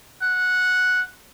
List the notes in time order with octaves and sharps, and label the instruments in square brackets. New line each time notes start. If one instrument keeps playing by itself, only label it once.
[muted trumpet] F#5